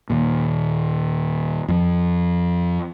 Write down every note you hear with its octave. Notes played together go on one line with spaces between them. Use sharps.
D#2 A#2
F2 F3